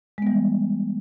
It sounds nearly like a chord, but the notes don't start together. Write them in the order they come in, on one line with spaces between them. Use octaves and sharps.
G#3 B3 G3 E3